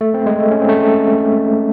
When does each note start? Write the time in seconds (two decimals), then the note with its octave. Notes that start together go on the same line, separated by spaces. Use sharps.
0.01 A3
0.14 C4
0.26 G#3
0.39 A3
0.51 C#4
0.61 C4
0.69 A3